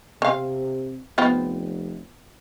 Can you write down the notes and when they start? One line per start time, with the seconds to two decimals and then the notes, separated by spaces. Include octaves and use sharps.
0.22 C3 C4 F5
1.18 F1 B3 C4 F4